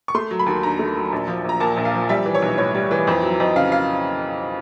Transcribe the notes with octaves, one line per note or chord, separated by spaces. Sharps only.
C#6
A3 C6
F#3
B5
D#2
D3 A#5
A3
F#3
A#1
F3
A#1 A#5
A#2 A5
A#1
F5
F3
G3 E5
E3
C#5
B1
A2 C#5
G3
E3
F2 C5
F#3
F2 D#5
C#3 F5
F5